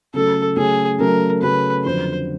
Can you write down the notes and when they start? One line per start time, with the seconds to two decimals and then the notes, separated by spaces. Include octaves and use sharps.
0.14 C#3 F#3 A3 C#4 A4
0.56 C#3 F#3 A3 C#4 G#4
0.99 C#3 F#3 A3 C#4 A#4
1.42 C#3 F#3 A3 C#4 B4
1.84 F2 D3 F#3 C5